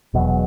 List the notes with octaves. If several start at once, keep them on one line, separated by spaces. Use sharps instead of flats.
E1 E2 B2 F#3